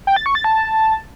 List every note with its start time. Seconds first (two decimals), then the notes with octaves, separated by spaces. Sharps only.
0.07 G5
0.16 A6
0.26 C#6
0.35 A6
0.44 A5